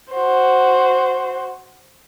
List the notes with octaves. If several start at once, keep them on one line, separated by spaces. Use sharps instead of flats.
F#4 C5